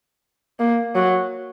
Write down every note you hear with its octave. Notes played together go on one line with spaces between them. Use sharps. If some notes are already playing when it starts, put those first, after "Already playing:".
A#3
F#3